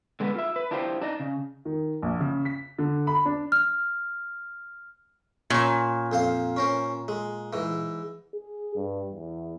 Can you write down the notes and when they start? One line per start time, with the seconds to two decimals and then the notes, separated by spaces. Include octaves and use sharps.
0.20 D3 G#3 B3 A4 B4
0.35 F4 E5
0.56 B4
0.71 D4 E4 F4 G4 B4 C5
1.02 D4 D#4 D5 D#5
1.20 C#3
1.65 D#3
2.03 A#1
2.20 C#3
2.45 B6
2.79 D3
3.07 B5
3.25 D4
3.52 F6
5.50 A#2 C#4
6.12 F2 C5 F5
6.57 C#4 A#4 C5
7.08 G#3
7.53 G#2 E3
8.34 G#4
8.76 G2
9.11 E2